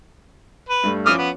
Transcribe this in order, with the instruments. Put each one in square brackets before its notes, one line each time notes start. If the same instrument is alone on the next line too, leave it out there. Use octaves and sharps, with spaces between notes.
[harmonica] B4
[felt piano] G2 G3 A3
[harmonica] E3 D#6 F6 [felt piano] F3 C#4 D6
[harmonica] B3